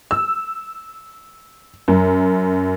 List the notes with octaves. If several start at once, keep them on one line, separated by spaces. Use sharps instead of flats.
E6
F#2